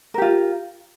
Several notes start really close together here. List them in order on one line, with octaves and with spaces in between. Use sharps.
A#4 G4 F4